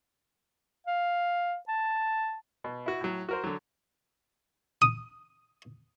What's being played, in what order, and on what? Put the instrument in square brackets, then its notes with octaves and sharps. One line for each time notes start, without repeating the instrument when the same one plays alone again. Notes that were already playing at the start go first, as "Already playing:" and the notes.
[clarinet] F5
A5
[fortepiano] B2
E4 F#4
A2 F#3
F#4 A#4 C5
D3 F#3
[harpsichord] D#6